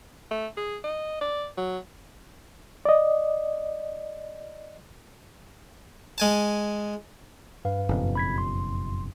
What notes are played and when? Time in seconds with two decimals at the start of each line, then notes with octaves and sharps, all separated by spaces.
0.31 A3
0.57 G#4
0.84 D#5
1.21 D5
1.57 F#3
2.85 D5 D#5
6.18 G#3 G#5 A5
7.65 G2 B4 F5
7.89 F#1 F2 B2
8.15 B5 G#6 B6
8.38 C6